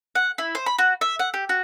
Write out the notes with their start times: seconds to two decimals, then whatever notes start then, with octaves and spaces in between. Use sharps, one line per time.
0.15 F#5
0.38 E4
0.55 C5
0.66 B5
0.78 F#4
1.01 E5
1.19 F#5
1.34 G4
1.49 F#4